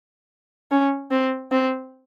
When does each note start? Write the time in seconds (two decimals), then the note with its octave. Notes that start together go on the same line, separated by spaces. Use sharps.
0.71 C#4
1.11 C4
1.52 C4